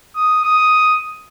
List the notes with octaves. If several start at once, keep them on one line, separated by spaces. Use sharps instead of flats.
D#6
D#6